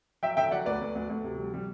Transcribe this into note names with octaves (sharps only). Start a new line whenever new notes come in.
F#3 E5 G5
D3 E5 G5
F#3 D5 F#5
D2 B4 D5
D2
D2
D2
C3
G3
G3